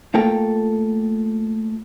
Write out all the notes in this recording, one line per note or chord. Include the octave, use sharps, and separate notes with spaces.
A3 A#3 F4 A4 A#4 G5